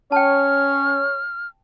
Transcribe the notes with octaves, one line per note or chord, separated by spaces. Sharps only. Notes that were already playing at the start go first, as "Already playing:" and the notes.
C#4 C#5 G5 A5 F6